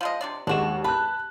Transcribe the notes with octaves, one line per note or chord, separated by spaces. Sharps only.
F3 G#3 D#5
C3 D4 D5
D#2 G#3 D4 F#4 E7
B4 A5 F#6